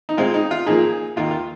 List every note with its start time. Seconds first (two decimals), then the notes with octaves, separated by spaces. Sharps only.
0.09 D#4
0.17 A#2 G#3 C4 F4
0.34 D#4
0.51 F4
0.66 A#2 F3 A#3 D#4 G#4
1.16 D#2 D#3 A#3 F4
1.31 F4